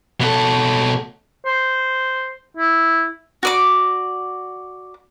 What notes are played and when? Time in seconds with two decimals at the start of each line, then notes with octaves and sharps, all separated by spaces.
0.21 B2 A4
1.46 C5
2.57 E4
3.43 F#4 D5 D6